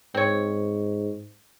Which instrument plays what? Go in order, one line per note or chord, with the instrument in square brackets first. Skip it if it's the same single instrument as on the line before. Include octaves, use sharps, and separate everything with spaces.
[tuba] G#2 [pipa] C4 C#5